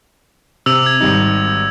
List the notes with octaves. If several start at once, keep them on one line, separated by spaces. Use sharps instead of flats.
C3 E6 F7
G#6
G#1 G3 D#4